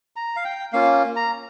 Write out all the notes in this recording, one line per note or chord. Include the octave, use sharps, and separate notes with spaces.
A#5
F5
G5
A#3 C#4 F4 F5
A#5